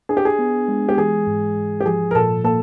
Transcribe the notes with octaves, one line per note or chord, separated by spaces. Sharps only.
D4 G#4
G4
G#4
B3
G#3
G4
E3 G#4
G#2
G#2
G4
F3 G#4
A#4
A#2 A4
A#3 A4